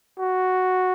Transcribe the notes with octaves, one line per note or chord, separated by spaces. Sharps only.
F#4